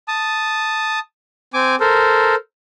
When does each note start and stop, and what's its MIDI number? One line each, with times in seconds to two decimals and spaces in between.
0.08 0.99 81
0.08 0.99 87
1.54 1.75 60
1.54 1.75 80
1.54 1.75 86
1.80 2.35 69
1.80 2.35 70
1.80 2.35 72